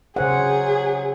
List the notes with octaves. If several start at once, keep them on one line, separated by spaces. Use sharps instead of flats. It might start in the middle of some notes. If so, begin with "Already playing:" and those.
C#3 F#3 G#4 C5 F#5